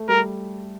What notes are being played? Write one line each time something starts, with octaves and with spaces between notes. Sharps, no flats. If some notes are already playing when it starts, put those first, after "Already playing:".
Already playing: A3
G3 A#4